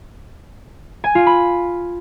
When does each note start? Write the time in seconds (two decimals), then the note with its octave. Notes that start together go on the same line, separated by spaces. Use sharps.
1.04 G#5
1.15 F4
1.27 B5